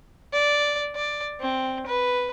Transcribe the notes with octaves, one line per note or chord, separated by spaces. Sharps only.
D5
D5
C4
B4